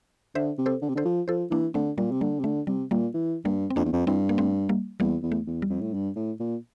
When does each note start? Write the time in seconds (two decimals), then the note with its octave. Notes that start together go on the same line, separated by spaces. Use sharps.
0.35 D3 C5 E5
0.58 C3
0.66 A4 C5
0.82 D3
0.89 C3
0.95 D3 A4 C5
1.05 F3
1.28 F3 A4 C5
1.51 E3 A#3 D4
1.74 D3 A3 C4
1.98 A#2 G3 A#3
2.12 C3
2.21 D3 G3 A#3
2.40 C3
2.44 D3 A3
2.67 C3 G3
2.91 A#2 G3 A#3
3.14 E3
3.45 G2 G3 A#3
3.70 C4
3.76 F2 A#3 D4
3.85 E2
3.93 F2
4.07 G2 C4 E4
4.29 A#3
4.38 A3 C4
4.69 G3 A#3
5.00 E2 G3 A#3
5.23 E2
5.32 A3
5.47 E2
5.62 G3
5.70 F2
5.81 A2
5.94 G2
6.16 A2
6.40 A#2